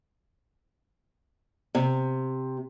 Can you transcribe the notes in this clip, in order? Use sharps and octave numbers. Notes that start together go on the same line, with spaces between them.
C3